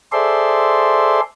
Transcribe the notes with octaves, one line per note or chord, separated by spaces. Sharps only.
G#4 A4 C5 D5 E5 C6